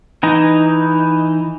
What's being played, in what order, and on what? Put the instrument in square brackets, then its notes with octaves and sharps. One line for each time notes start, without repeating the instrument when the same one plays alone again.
[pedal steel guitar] E3 D#4